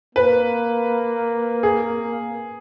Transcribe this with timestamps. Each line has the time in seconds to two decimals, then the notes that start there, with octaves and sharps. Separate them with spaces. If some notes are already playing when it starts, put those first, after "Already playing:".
0.15 A#3 B4
1.63 G#4